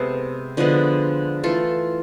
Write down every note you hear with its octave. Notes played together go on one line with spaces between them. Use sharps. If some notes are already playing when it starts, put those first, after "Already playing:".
Already playing: C3 G#3 B3 A4 C5
D3 F3 G#3 B3
E3 A3 F4 A4